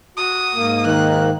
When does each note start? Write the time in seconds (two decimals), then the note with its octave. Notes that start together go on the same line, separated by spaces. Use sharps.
0.17 F#4 D#6
0.54 G#2 A#3
0.86 D#3 F#6